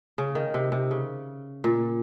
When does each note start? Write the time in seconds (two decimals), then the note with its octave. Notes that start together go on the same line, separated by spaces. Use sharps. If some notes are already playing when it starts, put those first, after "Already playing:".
0.18 C#3
0.35 D#3
0.54 C3
0.72 C3
0.91 C#3
1.64 A#2